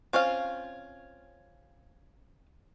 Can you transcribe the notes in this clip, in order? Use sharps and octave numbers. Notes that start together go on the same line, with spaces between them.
C4 C#4 F4 F5